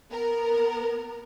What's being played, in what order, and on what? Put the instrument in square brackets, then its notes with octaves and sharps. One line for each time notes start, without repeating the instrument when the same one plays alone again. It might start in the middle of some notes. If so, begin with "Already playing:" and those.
[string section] B3 A#4